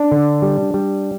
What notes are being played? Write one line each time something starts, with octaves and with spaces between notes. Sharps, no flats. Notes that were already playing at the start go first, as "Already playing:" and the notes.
Already playing: D4
D3
G3
G3